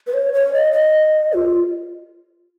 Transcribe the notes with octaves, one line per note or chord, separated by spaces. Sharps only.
B4
C#5
C#5
D#5
D#5
F4